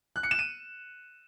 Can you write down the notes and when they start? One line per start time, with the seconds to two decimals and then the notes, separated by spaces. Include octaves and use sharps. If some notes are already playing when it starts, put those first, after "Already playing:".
0.16 F#6
0.23 C#7
0.31 E7
0.39 D#7